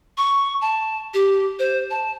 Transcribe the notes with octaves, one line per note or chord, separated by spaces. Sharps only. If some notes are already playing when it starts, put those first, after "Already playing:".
C#6
A5
G4
C5
A5